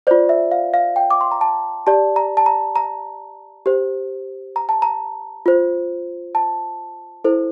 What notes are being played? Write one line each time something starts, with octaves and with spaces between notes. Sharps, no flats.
F4 C5 D5
E5
F5
F5
G5
D6
C6
A#5
A5
G4 D5 A5
A#5
A5
A#5
A#5
G4 C5
A#5
A5
A#5
F4 C5
A5
E4 A4 C5